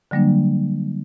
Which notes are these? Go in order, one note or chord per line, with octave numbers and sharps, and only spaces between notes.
D3 F#3 G3 A#3 D4